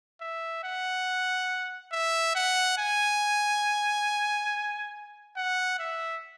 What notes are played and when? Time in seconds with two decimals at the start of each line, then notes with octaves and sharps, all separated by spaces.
0.21 E5
0.64 F#5
1.92 E5
2.35 F#5
2.78 G#5
5.36 F#5
5.79 E5